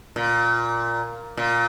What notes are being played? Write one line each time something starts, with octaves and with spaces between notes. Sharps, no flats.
A#2
A#2